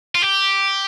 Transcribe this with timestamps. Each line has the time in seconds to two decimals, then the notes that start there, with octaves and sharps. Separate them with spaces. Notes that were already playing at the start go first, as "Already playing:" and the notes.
0.15 F4
0.22 G4